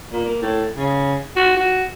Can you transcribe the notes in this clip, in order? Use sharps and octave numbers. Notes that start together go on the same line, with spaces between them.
A#2
A#3
A2
C#3
F#4
F#4